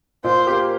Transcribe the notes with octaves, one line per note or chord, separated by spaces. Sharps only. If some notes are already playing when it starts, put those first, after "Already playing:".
A#2 C5
A#3 G4